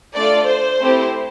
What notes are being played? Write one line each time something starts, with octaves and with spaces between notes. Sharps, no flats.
A3 D4 F4 A4 D5
C5
A3 C4 E4 G4